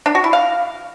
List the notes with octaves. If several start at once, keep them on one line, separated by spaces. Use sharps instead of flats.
D4
F#4
E4
F5